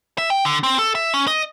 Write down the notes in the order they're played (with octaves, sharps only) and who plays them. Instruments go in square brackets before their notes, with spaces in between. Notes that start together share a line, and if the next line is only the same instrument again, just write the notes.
[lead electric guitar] E5
G5
D3
C4
A4
E5
C#4
D#5